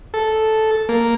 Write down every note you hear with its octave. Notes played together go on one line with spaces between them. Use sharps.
A4
A#3